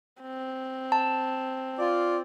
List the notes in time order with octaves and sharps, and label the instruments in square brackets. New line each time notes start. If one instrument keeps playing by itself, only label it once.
[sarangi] C4
[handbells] A5
[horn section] F4 D5